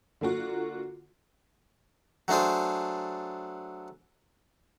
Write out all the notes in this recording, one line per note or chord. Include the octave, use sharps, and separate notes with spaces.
D3 A#3 F4 F#4
F#3 A3 D4 G#4 C5